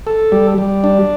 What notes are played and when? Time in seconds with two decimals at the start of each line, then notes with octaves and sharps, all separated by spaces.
0.07 A4
0.32 G3
0.58 G3
0.84 D4